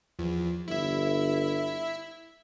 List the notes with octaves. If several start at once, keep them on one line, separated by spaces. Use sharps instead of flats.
E2 F3
G1 E4 E5